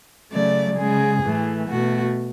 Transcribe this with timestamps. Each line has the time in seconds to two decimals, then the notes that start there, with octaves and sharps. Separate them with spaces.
0.31 C#3 F#3 A3 D5
0.78 C#3 G#3 G#4
1.23 A2 E3 A3
1.69 B2 A3 F#4